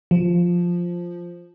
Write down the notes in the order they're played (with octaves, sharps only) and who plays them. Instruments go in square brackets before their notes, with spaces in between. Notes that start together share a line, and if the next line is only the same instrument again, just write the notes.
[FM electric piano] F3